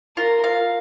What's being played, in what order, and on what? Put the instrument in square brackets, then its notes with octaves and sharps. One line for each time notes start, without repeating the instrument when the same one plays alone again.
[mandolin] F4 [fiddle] A#4
[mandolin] F5